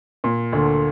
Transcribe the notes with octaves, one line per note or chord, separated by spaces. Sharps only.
A#2
D2 D3